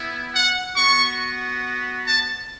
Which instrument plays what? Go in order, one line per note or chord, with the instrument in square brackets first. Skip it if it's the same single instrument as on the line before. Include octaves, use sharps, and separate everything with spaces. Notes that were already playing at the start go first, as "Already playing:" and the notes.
Already playing: [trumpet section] B3 E4
F#5
B3 F#4 C#6
A5